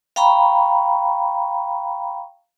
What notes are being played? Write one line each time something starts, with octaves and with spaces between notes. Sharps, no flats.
F5 G5 A#5 B5 C#6